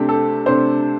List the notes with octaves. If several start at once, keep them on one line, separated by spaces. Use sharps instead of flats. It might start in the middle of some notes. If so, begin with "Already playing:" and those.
Already playing: C3 A3 D4 G4
A4
C3 A3 D4 C5